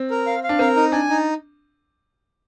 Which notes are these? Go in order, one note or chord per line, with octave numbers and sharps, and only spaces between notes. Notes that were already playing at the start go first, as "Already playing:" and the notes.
Already playing: C4
A#4
F5
F5
D4
C4 A#4
D#4
D4 G#5
D#4